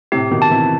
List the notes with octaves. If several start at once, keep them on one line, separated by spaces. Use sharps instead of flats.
A2 C3 G4
B2 D#3
A5
C3 E3